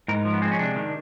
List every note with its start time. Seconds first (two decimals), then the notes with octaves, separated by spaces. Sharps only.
0.08 G#2 A#4
0.25 F3
0.33 B3
0.42 G#3 C4
0.51 C#4
0.59 C3 D4
0.76 D#3